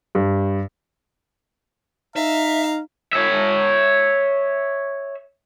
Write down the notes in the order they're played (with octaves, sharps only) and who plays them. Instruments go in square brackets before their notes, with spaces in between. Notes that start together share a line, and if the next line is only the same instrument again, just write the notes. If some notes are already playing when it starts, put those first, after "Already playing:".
[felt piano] G2
[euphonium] D#4 [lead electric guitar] E5 [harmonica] F5 A#5
[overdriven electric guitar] C#5 E5